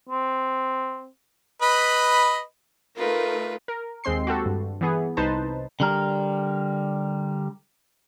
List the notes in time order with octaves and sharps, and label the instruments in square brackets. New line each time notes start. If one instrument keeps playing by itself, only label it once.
[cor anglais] C4
[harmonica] B4 D#5 B5
[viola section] A3 D#4 A#4 [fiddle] F4 B4
[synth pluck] A#4
D#2 G#3 C4 C6 C7
F#4 G4 A4
G2
E3 B3 G#4
C2 D#4 B4 C5 A5
[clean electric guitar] D3 G3 A#4